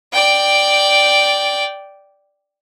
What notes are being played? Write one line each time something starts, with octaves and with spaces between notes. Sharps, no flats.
D5 G5